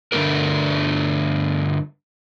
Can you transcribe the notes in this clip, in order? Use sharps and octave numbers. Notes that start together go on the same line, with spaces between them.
G2 D3 A3 A#3 G4 A#4